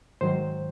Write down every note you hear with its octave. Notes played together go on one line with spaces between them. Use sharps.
G#2 D#3 F#3 C5